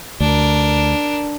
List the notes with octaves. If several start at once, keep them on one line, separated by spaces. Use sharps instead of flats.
D2 D4 A#4